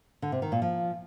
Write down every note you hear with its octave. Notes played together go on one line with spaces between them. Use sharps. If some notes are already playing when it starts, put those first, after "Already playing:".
D3
C3
D#3
A#2
F3